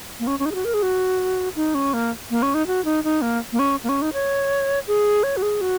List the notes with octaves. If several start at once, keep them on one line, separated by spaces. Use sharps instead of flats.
A#3
C#4
C#4
D#4
G#4
F#4
A#4
G#4
F#4
D#4
C#4
A#3
A#3
C#4
D#4
F#4
D#4
D#4
A#3
A#3
C#4
A#3
C#4
D#4
C#5
G#4
C#5
F#4
G#4
F#4